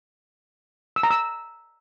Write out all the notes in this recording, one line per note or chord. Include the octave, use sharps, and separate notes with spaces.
E6
A#5
E6